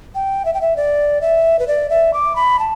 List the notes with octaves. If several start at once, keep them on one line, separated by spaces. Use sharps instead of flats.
G5
E5
G5
E5
D5
E5
B4
D5
E5
D6
B5
A5